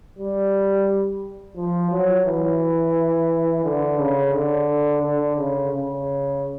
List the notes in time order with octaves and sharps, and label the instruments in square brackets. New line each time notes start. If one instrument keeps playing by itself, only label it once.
[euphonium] G3
F3
F#3
E3
D3
C#3
D3
D3
C#3
C#3